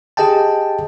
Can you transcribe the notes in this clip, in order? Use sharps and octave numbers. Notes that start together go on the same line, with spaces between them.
G4 G#4 D#5 G5 A5